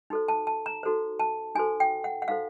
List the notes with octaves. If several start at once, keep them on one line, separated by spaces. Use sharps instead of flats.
D#4 F#4 A4 C5
A5
A5
A#5
D#4 F#4 A4 C5
A5
D#4 F#4 A4 C5 G#5
G5
F#5
F#5
D#4 F#4 A4 C5 F5